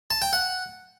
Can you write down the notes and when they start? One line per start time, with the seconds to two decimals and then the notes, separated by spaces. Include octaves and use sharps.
0.11 A5
0.22 G5
0.33 F#5